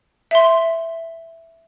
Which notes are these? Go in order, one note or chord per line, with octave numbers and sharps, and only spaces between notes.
E5 C6